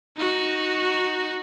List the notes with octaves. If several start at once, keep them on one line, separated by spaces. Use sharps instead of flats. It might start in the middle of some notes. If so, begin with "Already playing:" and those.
D#4 F#4